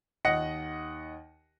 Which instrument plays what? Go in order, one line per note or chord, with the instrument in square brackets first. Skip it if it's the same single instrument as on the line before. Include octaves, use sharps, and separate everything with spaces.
[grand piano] D#2 D#5 F#5 A#6 C#7